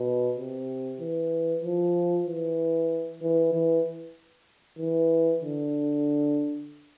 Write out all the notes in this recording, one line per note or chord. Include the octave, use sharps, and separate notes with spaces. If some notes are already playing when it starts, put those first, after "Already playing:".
Already playing: B2
C3
E3
F3
E3
E3
E3
E3
D3